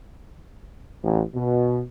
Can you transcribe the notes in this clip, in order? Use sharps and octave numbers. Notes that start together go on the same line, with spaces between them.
A1
B2